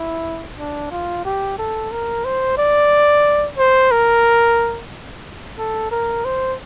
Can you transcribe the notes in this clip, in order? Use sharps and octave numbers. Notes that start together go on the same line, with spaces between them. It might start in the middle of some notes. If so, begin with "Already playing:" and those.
Already playing: E4
D4
F4
G4
A4
A#4
C5
D5
C5
A#4
A4
A#4
C5